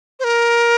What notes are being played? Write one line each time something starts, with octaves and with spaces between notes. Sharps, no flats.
C5
A#4